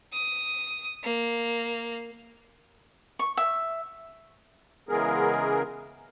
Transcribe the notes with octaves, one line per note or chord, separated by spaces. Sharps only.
D#6
A#3
C#6
E5
C#3 E3 G#3 B3 G#4 A#4